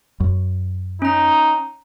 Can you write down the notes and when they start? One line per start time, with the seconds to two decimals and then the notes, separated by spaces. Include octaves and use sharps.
0.20 F#2
1.02 C#4 D#4 A#5